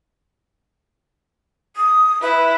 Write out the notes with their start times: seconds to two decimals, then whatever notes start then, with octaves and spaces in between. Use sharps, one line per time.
1.76 D#6
2.22 E4 B4